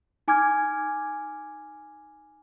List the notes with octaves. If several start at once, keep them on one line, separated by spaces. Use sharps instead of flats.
D#4 G#5 D6 F6 G#6